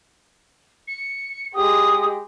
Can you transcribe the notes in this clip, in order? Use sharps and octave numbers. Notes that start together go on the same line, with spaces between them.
C#7
G#3 G4 D#6